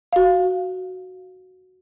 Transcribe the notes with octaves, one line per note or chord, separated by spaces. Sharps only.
F#4 F5